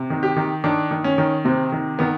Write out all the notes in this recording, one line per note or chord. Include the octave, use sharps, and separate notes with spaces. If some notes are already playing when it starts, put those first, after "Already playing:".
Already playing: C3
D#3
G4
D#3
D#3 D4
D#3
C#4
D#3
C3 C4
D#3
D#3 B3